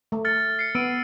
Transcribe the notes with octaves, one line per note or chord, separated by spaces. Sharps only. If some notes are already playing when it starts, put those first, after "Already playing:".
A3
F6 A6 C#7
C7 C#7
B3 E6 D7 D#7